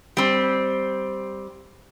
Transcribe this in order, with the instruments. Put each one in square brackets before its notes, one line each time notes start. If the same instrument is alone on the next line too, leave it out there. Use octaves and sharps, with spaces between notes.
[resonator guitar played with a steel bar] G3 C4